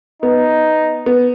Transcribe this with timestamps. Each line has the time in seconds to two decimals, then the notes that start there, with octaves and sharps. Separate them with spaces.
0.22 B3 D#4
1.06 B3